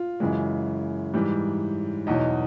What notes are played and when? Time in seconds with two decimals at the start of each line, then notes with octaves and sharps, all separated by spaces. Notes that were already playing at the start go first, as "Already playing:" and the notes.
Already playing: F4
0.20 F#2 C#3 E3 G#3
1.14 G#2 E3 G3
2.07 E2 B2 F#3 D#4